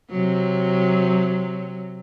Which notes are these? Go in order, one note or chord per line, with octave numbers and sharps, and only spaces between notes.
C3 F#3